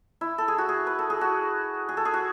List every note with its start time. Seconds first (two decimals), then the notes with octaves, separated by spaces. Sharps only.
0.21 E4
0.38 A4
0.48 G#4
0.58 F#4
0.69 G#4
0.87 B4
0.99 A4
1.10 G#4
1.21 F#4
1.89 G#4
1.97 A4
2.05 G#4
2.14 F#4